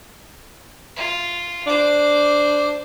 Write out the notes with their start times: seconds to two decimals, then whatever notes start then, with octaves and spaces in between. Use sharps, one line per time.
0.96 F4
1.67 D4 C5 D6